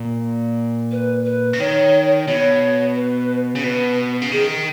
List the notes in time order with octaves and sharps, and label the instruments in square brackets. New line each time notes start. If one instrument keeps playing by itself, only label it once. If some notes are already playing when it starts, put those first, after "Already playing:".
Already playing: [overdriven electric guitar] A#2
[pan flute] B4
B4
[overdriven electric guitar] C#3
[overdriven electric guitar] D#3 [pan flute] C#5
[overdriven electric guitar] B2 [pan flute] C#5
[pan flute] B4
[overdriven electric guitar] C#3
[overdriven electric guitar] B2 [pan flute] B4
[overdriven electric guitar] C#3
[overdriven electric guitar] D#3 [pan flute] G#4